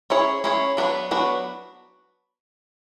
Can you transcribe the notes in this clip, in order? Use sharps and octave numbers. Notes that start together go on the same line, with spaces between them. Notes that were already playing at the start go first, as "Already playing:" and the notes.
C#4 E4 G#4 C#5
C#4 E4 G#4 C#5
F#3 B3 D4 F#4 B4
F#3 B3 D4 F#4 B4